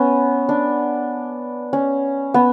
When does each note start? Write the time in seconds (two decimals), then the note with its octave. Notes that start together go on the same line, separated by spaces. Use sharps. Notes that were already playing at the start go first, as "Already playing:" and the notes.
Already playing: B3 C#4
0.49 D4
1.73 C#4
2.34 B3